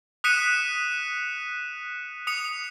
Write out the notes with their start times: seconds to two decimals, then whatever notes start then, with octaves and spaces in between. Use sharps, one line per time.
0.24 D#6 F#6 B6 C#7 D#7 E7
2.27 D#6 C#7 F7